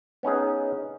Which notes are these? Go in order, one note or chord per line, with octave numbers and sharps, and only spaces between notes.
B3 C#4 D#4 G#4